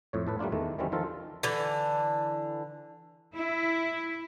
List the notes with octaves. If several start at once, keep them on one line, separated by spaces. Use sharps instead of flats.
F2 A2 C#5
A2 A4 B4
G3 A3 A#3 D4 F4
E2 D#3 A3
D#3 E3 F#3 G3 C4 C#4
D#3 F3 F4 A4
D3 E3
E4